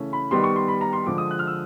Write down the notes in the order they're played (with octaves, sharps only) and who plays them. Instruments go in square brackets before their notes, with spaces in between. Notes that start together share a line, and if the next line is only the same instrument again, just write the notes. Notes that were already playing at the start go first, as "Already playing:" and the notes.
Already playing: [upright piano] C#3 E3 A3 C#4
B5
D#3 G3 B3 C6
C#6
C6
B5
A#5
C6
D3 F3 G#3 D6
D#6
F#6
F6
E6